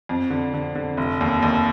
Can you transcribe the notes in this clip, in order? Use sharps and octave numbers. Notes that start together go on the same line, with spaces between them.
F2
D3
D3
D3
F1
D#2
D#2